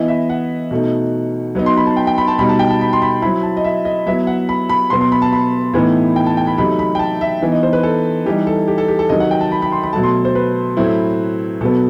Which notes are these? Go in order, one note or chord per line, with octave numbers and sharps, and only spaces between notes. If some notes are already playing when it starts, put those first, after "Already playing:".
Already playing: E3 B3 E4 D#5
E5
F#5
B2 A3 D#4
F#3 B3 D#4
C6
B5
A5
G5
G5
B5
A5
B2 G3 D#4 B5
A5
G5
A5
B5
C6
B5
F#3 C4 E4 B5
A5
D#5
E5
D#5
F#3 B3 E4 E5
F#5
B5
B5
B2 F#3 B3 C6
C6
B5
A5
B5
A2 E3 B3 D#4
G5
A5
G5
B5
C3 F#3 A3 D#4 B5
B5
G5
A5
E5
E3 B3 D#4
D#5
C5
B4
A4
E3 G3 D#4 G4
A4
G4
A4
G4
A4
C3 D#3 F#3 D#5
F#5
G5
A5
B5
B5
C6
B5
B2 F#3 A3 A5
C6
C5
B4
A2 F#3 A3 C4 E4
B2 F#3 B3 A4